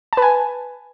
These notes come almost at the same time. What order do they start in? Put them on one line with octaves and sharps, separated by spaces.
A5 B4 G#5